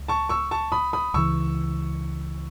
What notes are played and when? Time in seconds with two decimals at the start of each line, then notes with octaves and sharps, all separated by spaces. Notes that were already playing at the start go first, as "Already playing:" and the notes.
Already playing: C#2
0.08 A5 C#6
0.29 C#6 E6
0.51 A5 C#6
0.72 B5 D#6
0.93 B5 D#6
1.14 C#2 C#3 E3 C#6 E6